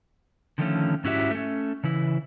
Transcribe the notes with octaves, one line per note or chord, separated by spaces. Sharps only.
D3 D#3 F3 F#3 A3 C#4
G#2 C#4 E4 F#4 G4 E5
A3 C#4
C#3 E3 E4